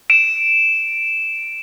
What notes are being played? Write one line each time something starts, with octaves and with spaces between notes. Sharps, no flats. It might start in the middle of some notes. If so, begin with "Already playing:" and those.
D7 E7